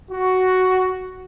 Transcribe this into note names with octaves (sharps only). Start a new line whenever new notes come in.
F#4